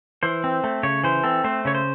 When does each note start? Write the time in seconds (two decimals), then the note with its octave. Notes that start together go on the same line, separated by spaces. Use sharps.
0.23 E3 C5
0.44 C4
0.64 A3
0.83 C#3 C#5
1.04 E3 C5
1.24 C4 A4
1.44 A3 C5
1.65 C#3 C#5
1.75 C5